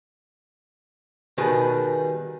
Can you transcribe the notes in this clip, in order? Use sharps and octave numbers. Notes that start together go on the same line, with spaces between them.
B2 D#3 G3 G#4 B4